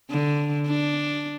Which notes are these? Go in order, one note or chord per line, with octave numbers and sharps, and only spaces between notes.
D3
D4